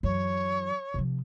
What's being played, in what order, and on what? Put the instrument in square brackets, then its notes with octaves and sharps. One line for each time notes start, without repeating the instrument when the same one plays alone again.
[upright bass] F#2 E3 [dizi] C#5
[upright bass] C3 F3